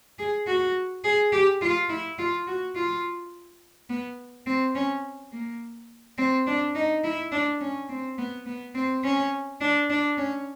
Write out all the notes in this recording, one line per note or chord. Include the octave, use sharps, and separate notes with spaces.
G#4
F#4
G#4
G4
F4
E4
F4
F#4
F4
B3
C4
C#4
A#3
C4
D4
D#4
E4
D4
C#4
C4
B3
B3
C4
C#4
D4
D4
C#4